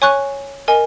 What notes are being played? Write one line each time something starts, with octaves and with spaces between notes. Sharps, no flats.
C#5 G#5 C#6 F#6
A#4 D#5 G#5